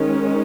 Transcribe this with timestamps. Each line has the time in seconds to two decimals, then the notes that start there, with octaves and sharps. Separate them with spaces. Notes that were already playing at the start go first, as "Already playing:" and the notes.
Already playing: D#3 G#3 C#4